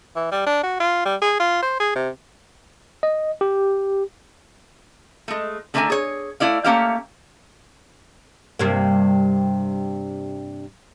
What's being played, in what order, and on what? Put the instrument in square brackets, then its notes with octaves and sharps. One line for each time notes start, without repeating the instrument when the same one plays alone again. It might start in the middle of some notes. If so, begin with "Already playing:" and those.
[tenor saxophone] E3
G3
D4
F#4
F4
G3
G#4
F4
C5
G#4
C3
[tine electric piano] D#5
G4
[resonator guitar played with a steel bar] G#3 A3
D3 A3 D4 A#4 E5 G#5
G#4 C#5
A3 E4 D5 F5
A3 A#3 C#4 G4 E5 F5
[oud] G2 C3 A#3